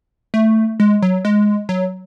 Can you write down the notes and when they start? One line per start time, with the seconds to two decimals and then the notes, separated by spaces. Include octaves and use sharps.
0.34 A3
0.80 G#3
1.02 F#3
1.25 G#3
1.69 F#3